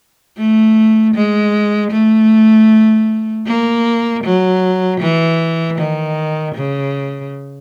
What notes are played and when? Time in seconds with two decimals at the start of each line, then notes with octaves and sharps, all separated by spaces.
0.37 A3
1.15 G#3
1.92 A3
3.47 A#3
4.24 F#3
5.01 E3
5.78 D#3
6.55 C#3